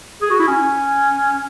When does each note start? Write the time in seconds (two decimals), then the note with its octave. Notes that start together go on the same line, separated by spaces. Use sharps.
0.22 G#4
0.30 F#4
0.39 E4
0.48 C#4